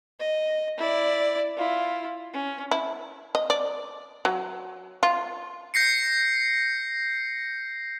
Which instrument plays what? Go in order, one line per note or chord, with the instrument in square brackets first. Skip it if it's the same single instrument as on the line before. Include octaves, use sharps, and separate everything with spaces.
[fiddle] D#5
E4 D5
E4 F4
C#4
[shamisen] E4
D#5
D5
F#3
F4
[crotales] G6 A#6 C7 C#7